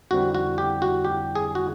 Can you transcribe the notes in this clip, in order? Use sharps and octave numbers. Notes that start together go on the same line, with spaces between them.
F2 D3 G3 C4 E4 F#4
F#4
G4
F#4
G4
G#4
F#4